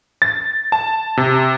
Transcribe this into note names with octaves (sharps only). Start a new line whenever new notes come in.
A6
A5
C3